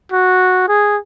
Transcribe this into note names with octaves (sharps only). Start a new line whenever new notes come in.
F#4
G#4